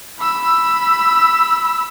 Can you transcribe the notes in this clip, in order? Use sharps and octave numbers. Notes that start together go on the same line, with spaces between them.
B5 E6